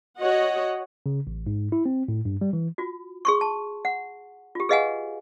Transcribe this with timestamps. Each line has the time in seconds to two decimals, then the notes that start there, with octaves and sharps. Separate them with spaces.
0.19 F#4 C#5 D#5 F#5
1.06 C#3
1.27 A1
1.47 G#2
1.72 E4
1.86 C4
2.08 A2
2.25 G2
2.41 G3
2.53 E3
2.78 F4 F#4
3.25 G#4 C6 C#6
3.41 A5
3.85 F#5
4.55 F4 G4
4.69 G#4 B4 D#5 F5 F#5 G#5